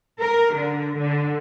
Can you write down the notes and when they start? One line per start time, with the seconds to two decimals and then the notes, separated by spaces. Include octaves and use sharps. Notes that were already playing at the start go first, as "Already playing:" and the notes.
0.20 A#4
0.54 D3
0.98 D3